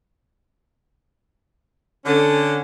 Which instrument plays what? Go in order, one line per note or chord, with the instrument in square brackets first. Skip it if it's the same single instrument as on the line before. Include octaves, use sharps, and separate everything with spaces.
[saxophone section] D3 C#4